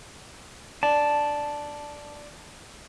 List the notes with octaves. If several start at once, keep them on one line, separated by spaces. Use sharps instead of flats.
D4 A5